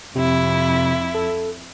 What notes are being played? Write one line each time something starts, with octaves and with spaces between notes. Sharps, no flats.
F2 C3 E4
A4